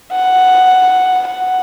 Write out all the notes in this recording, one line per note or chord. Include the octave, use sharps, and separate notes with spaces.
F#5
F#5